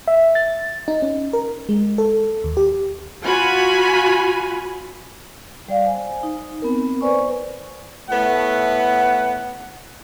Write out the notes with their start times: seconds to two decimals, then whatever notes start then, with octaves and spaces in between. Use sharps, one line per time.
0.08 E5
0.35 A6
0.88 D#4
1.02 C#4
1.33 A#4
1.69 G#3
1.98 A4
2.44 D#2
2.57 G4
3.23 F4 F#4 G#5 B5
5.69 G3 D5 F5
5.85 C5 G#5
6.23 D#4
6.62 B3 C4 A#4
7.01 B4 C5 D5 G#5 C#6
8.10 A2 A3 B3 F#5